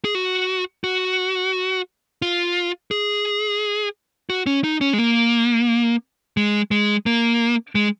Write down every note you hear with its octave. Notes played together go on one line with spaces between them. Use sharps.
G#4
F#4
F#4
F4
G#4
F#4
C#4
D#4
C#4
G#3
A#3
G#3
G#3
A#3
G#3